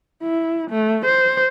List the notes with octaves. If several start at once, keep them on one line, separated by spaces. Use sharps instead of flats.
E4
A3
C5